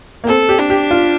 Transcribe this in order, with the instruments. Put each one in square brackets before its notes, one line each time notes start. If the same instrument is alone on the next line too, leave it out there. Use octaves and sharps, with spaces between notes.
[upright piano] A#3
[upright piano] C4 [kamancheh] A4
[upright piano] G4
[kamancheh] D4
[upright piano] G4
F4